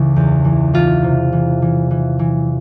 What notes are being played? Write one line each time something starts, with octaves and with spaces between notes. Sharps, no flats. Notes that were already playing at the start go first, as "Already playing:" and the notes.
Already playing: C#2 C#3 E3 E4
E2
E3
E3 F4
C3
E3
E3
E3
E3